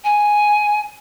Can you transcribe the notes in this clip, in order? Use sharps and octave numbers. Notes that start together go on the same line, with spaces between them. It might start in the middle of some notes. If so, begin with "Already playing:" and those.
G#5